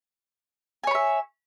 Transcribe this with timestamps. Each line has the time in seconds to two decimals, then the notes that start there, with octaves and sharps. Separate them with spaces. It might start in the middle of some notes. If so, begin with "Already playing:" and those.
0.84 G#5
0.87 C#5
0.91 B5
0.95 E5